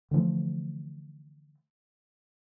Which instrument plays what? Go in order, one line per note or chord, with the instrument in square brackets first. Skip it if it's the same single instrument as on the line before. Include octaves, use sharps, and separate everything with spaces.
[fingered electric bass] D3 E3 F3 A3